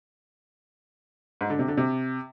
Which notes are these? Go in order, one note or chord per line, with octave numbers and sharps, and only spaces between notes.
G#2
D3
C3
D3
C3